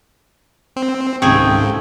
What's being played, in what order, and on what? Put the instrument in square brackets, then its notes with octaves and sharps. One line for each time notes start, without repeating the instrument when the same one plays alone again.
[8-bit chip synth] C4
[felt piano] C#2 C3 D#3 [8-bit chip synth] G#2 [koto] A3 G#4 [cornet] G5